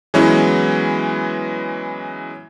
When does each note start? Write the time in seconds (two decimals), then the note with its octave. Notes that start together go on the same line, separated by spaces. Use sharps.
0.14 E3 F#3 G#3 B3 C#4 E4